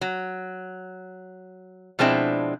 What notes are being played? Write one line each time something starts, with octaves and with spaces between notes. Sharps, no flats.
F#3
B2 F3 G#3 C4 D4 E4